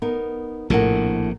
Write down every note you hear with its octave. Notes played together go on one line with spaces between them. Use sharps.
B3 D#4 A#4
A#1 A2 C3 A#4 F#5